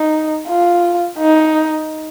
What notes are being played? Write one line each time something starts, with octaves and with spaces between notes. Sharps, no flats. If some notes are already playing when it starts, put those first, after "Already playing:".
Already playing: D#4
F4
D#4